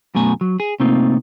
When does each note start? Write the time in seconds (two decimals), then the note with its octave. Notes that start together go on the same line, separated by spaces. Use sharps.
0.15 F#2 B2 A3 G#5 A#5
0.41 F#3
0.60 G#4
0.80 C3 A3 A#3 C4 D#4 F4